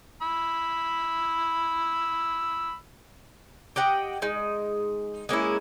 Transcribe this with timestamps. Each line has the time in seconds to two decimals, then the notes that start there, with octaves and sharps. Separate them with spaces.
0.22 B5 E6
3.76 G4 D#5 F#5 G5
4.22 G#3 D#4
5.29 G#3 A#3 C#4 E4